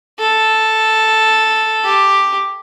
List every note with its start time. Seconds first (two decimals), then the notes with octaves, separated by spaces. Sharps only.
0.19 A4
1.84 G4